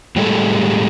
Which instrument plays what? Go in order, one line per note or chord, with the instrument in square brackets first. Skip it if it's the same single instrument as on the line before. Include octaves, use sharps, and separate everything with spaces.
[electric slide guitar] A2 G3 G#3 G4 A4